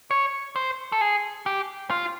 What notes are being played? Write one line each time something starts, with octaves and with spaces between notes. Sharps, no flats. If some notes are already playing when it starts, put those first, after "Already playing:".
C#5
C5
A4
G#4
G4
F4